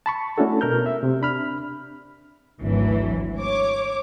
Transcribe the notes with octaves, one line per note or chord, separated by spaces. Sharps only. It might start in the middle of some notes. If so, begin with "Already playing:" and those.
A5 B5 C#6
A3 C#4 D4 E4 F#4 A4
B2 A#4 F6 G6
E5
C3
D4 B5 F6
G#1 D2 E3 F#3
C#5 D6